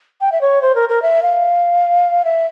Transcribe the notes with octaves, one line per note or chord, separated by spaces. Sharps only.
G5
E5
C#5
C5
A#4
A#4
E5
F5
E5